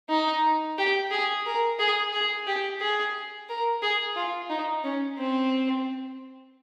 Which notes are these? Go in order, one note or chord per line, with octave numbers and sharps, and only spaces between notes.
D#4
G4
G#4
A#4
G#4
G#4
G4
G#4
A#4
G#4
F4
D#4
C#4
C4